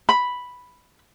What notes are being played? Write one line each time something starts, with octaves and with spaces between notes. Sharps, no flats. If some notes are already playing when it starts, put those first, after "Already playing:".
B5